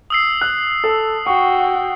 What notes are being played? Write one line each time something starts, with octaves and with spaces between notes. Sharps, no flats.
D#6 E6 C7
F#6
A4
F#4 G5 C#6